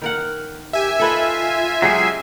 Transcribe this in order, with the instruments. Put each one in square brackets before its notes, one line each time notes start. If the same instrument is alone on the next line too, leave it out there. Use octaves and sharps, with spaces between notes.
[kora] D#3 A#4 F#5
[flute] G4 [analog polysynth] E5 G#5
[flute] F4 [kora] A4 B4 D#5
[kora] C#3 G4 [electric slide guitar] F#3 G#3 G#4